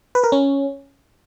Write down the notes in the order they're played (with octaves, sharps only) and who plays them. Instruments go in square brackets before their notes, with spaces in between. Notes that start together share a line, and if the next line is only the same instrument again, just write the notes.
[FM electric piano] B4
A#4
C#4